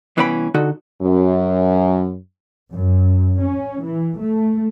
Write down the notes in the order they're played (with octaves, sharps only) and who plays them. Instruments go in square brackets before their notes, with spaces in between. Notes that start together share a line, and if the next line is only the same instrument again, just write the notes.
[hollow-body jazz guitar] C2 E3 B3 C#4 G5 B5
D3 D#4 F#4 A4
[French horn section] F#2
[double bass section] F#2
C#4
E3
A3